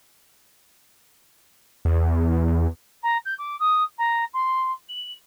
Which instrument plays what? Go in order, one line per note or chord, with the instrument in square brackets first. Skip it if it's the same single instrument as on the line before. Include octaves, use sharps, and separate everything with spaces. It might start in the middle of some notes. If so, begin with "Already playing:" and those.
[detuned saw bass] E2
[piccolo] A#5
G6
D6
D#6
A#5
C6
F#7